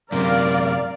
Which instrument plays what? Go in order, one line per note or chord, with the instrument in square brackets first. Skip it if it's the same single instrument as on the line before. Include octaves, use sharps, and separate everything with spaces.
[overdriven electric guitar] F#2 C3 [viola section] A#4 D5 F5